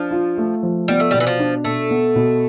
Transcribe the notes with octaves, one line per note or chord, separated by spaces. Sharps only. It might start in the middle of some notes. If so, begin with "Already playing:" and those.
Already playing: F3 D4
F4
A3
F3
G3 B3
A3
B2 G3
E3
F3
D4
B2 A3
B3
B2